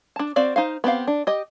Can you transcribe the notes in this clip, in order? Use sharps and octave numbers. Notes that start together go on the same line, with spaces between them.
D4 A5
C4 F#4 D5 F5
D#4 C5 F5
B3 C4 G4 F5
D4
G4 D#5